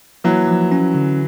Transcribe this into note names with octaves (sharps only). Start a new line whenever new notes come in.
E3 F#3 A#3
F3
C#4
D3